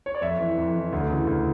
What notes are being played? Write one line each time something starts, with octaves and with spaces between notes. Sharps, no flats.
C#5
D5
F2 C#5 E5
E3
F2
E3
D2
C#3 E3
D2